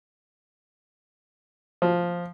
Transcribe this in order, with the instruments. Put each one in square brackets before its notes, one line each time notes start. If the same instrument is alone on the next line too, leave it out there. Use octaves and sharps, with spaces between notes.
[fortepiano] F3